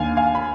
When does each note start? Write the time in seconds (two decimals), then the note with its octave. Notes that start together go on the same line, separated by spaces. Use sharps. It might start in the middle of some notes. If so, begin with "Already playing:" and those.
Already playing: D#2 D4 F5 G#5
0.17 F5 G#5
0.35 B5